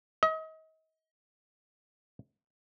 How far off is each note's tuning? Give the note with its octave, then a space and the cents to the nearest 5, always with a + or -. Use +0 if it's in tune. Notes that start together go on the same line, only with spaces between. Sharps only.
D#5 +35